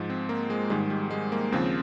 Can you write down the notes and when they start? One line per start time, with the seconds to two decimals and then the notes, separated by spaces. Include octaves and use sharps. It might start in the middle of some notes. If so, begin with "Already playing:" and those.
Already playing: G#2 F3
0.10 C4
0.29 A#3
0.50 G#3
0.70 G#2 D#3 G3 G#3
0.90 G3
1.11 G#3
1.32 A#3
1.52 D#2 C#3 F3 C4